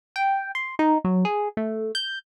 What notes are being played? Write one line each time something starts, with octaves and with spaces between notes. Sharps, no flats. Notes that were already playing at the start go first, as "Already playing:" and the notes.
G5
C6
D#4
F#3
G#4
A3
G6